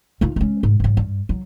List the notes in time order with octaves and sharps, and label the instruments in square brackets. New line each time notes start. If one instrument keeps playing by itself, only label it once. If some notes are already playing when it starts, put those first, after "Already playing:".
[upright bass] D#3 F4
G#3 C#4
G#2
G#2 F#3
G2
F#3